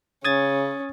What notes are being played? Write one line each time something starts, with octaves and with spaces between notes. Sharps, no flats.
C#3 C#4 D#6 G#6 A6